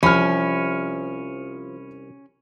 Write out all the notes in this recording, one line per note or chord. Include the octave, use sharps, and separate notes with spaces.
C2 F3 C#4 B5 F6